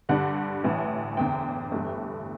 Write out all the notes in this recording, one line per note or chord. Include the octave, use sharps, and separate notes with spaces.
G2 D3 G3 D4 F#5
A1 A2 E3
F#1 E2 D3 G5
G1 G2 E3 A3